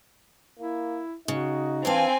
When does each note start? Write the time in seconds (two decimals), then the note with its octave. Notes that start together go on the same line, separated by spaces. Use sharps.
0.59 A#3 E4
1.28 C#3 D#4 F#4
1.85 E3 C4 D4 F5 G#5